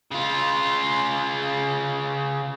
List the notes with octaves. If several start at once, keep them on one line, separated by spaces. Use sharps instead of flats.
C#3 F4